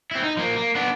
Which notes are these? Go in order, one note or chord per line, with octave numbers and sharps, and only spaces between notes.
C4 E4
D#4
F3 A#3
A#3
B3 D4